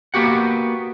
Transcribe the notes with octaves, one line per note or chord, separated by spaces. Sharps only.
A#3 B3 F#4 G4 F#5